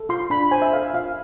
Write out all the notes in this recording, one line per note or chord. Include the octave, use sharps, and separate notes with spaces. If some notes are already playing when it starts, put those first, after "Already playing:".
Already playing: A4
F4 C6
D4 B5
C5 G#5
E5
A4 F5
E5
F4 F5